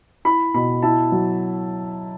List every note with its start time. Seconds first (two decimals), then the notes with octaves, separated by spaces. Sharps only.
0.25 E4 B5
0.54 B2 B5
0.83 E4 A5
1.12 F#3